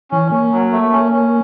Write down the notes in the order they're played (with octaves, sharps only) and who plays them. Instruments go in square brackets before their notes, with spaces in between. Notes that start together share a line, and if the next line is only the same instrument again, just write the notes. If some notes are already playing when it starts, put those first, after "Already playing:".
[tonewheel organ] E3 [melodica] C#4
[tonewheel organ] A#3 [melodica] C#4
[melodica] F#3
A3
C#4
C#4